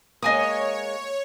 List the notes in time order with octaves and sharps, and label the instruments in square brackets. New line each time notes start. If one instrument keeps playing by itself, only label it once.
[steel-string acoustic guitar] G#3 A#3 [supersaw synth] C#5 [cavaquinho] D#5 G#5 D#6